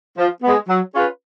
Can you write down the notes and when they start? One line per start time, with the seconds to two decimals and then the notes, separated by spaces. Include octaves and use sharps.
0.18 F3
0.43 G#3 B3
0.69 F#3
0.95 C#4 F4 G#4 B4